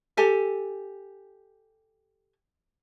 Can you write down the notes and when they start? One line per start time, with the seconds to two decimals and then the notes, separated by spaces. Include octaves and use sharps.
0.17 G4 A4 G#5